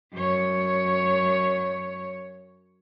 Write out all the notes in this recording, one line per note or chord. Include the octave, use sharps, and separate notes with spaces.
F#2 C#5